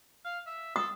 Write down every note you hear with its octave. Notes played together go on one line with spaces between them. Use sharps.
F5
E5
A4 D#6